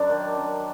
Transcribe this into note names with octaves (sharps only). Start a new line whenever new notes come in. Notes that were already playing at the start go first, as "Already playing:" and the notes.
Already playing: F#2 D4
D#3
F#2